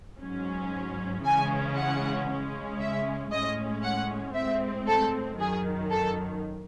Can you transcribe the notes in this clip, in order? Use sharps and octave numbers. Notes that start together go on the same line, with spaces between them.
G#2 F#3 C#4
C#3 E3 G#3 C#4 G#5
F#5
C#3 G#3 C#4
E5
A2 G#3 C#4 D#5
F#5
A2 G#3 C4 E5
A4
F#2 D#3 F#3 G#4
A4